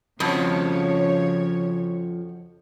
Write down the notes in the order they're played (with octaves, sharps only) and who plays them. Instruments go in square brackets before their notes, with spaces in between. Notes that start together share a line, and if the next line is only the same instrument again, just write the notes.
[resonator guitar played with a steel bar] F2 [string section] C#3 C#5 [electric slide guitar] F3 F#4